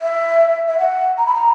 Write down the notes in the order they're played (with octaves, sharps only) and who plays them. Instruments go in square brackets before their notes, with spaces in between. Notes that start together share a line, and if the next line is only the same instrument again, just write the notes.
[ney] E5
E5
F#5
A#5
B5
A#5